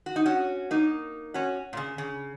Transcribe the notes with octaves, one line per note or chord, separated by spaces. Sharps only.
F#4
D#4
C#4 F#4
A#3 D#4
C#4 F#4
A#2
C#3
C#3